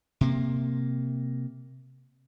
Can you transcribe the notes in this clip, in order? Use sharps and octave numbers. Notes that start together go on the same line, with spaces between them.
C3 A#3